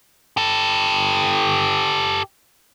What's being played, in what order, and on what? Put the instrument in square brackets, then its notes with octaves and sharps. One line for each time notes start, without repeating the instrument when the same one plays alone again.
[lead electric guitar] G4 A4